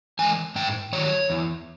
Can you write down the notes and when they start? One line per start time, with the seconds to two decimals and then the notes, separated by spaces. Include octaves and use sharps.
0.19 E3 G#3 G#5
0.56 G#2 G5
0.93 D#3 F#3 C#5
1.30 E2